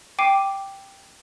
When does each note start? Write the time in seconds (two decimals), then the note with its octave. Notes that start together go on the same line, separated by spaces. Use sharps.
0.19 G5 D6 C7 D#7